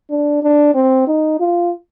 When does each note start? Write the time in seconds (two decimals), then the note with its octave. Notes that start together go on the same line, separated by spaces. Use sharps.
0.10 D4
0.43 D4
0.74 C4
1.07 D#4
1.40 F4